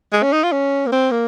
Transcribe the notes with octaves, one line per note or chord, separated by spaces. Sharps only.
G#3
C#4
D#4
F4
C#4
A#3
C4
A#3